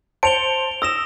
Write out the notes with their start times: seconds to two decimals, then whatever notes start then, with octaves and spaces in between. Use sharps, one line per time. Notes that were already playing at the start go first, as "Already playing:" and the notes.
0.23 C5 A5 C#7 D7 F7 G7
0.82 D#6 E6 A#6 E7